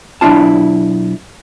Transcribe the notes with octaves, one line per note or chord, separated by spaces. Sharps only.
B1 D#3 D4 E4 F4 A5